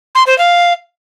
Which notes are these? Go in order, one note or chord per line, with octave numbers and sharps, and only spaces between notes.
C6
C5
F5